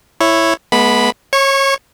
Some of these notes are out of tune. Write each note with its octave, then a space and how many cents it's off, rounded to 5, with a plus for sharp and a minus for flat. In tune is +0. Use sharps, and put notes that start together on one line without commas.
E4 +5 C#5 -10
G#3 +25 B3 -30 B5 +0
C#5 -25 C#6 +0